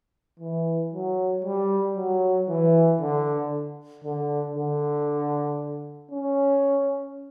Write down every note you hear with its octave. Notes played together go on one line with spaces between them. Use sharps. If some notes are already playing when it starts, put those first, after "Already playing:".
E3
F#3
G3
F#3
E3
D3
D3
D3
C#4